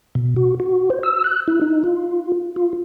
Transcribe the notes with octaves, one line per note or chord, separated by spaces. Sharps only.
B2
F#4
F#4
C5
E6
F#6
E4
D#4
F4
F4